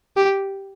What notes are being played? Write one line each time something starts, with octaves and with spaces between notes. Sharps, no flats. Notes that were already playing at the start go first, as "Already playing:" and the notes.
G4